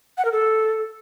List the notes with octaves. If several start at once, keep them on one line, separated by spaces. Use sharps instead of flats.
F#5
A#4
A4